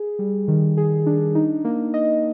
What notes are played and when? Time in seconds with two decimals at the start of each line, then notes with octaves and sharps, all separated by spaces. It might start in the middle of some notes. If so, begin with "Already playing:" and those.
Already playing: G#4
0.19 G3
0.48 D#3
0.77 G#4
1.06 D4
1.35 D#4
1.65 A#3
1.94 D#5